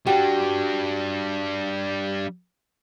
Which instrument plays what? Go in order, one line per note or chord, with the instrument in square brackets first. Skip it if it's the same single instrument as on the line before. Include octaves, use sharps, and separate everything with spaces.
[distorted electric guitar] G3 D4 [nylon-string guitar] F#4 G4